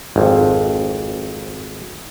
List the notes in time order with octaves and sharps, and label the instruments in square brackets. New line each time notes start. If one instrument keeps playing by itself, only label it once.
[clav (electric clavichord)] G#1 F2